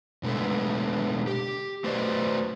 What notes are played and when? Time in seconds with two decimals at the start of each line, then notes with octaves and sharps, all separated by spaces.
0.23 B2 D3 G#3 A3 B3
1.27 G4
1.84 A3 F#4 B4 C5 D5 D#5